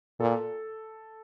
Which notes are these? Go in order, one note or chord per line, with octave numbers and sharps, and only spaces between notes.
A#2 A4